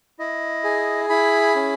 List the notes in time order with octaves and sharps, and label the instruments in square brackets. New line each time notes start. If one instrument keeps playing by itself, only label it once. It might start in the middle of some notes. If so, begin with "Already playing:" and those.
[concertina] E4 D#5
G#4
E4 B5
C#4